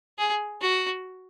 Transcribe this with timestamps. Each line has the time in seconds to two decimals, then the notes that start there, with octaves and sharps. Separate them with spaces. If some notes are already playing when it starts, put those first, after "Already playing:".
0.18 G#4
0.62 F#4